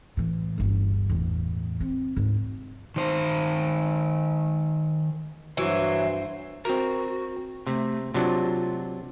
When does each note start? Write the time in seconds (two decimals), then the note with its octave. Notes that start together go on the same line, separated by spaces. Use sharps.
0.17 A2 E3
0.58 G1 D2
1.10 E2 A2
1.80 C4
2.16 D2 G#2
2.96 D#3 C5
5.57 G2 E3 F#3 C5
6.65 C4 F#4 A#4
7.67 C3 A3
8.14 C3 F#3 D4 F4